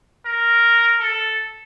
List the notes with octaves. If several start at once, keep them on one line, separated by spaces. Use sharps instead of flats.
A#4
A4